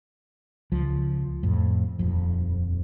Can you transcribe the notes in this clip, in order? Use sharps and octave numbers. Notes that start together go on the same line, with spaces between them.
C#2 F3
F2 A2
D#1 F2